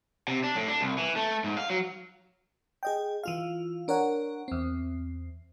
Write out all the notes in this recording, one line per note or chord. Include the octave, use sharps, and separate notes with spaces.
C3
D4
A2
D4
C2
E3
A3
G#2
F5
F#3
G#4 D#5 G5
E3 F4 F5
D4 A#4 C#5 F#5
E2 C4